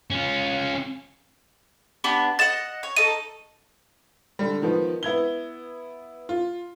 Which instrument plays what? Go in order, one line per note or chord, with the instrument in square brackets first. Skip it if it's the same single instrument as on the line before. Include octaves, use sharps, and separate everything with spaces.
[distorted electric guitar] C#4 F4
[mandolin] B3 D4 G4
[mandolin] D#5 F#5 [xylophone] A6 E7
[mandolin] C#5
[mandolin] D#4 A4 [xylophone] D#7
[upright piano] D3 G3
D#3 F3 B3
B3 E4 G#6 G7
F4